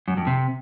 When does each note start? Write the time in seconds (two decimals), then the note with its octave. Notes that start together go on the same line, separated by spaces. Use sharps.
0.08 F#2
0.17 F2
0.27 C3